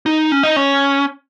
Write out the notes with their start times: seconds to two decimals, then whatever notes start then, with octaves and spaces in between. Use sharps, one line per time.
0.06 D#4
0.32 C#4
0.43 D#4
0.56 C#4